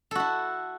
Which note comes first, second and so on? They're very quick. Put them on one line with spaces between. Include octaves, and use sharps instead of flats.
A4 F#4 E4